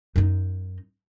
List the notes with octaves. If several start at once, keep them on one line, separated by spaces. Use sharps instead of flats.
F#2 D#4